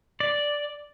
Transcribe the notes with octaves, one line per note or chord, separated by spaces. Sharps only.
D5